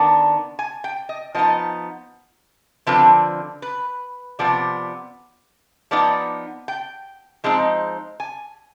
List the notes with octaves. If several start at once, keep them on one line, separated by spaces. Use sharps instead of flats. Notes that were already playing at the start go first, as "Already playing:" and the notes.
Already playing: D#3 B3 D4
G#5
G5
D#5
F3 B3 D#4 D#5
D3 F3 C4 B4
B4
C3 F3 B3 D5
F3 B3 D#4 D5
G5
F3 G#3 C4 D#4
G#5